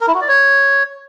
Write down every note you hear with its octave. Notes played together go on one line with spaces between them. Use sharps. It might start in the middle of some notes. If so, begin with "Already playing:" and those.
A#4
E4
F#4
D5
C#5